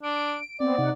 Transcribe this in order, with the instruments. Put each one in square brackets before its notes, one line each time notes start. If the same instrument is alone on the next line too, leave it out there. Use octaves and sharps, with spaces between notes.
[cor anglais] D4 [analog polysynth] D7
[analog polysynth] B3 C4 [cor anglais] D5
[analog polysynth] C3 D#4 F#5